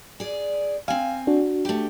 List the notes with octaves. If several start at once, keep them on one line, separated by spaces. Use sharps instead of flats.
G#4 D5
C4 F5 G#5
D4 F#4
A3 G4